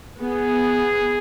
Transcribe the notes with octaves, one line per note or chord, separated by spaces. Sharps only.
B3 G#4